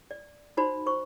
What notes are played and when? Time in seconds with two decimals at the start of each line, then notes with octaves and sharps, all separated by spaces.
0.11 D5
0.57 D#4 F#4 C5 D5 B5
0.87 C5 C#6